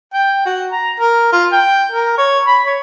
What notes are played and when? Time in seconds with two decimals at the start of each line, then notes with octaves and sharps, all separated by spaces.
0.14 G5
0.46 F#4
0.71 A#5
1.00 A#4
1.32 F4
1.52 G5
1.92 A#4
2.18 C#5
2.47 B5
2.66 C#5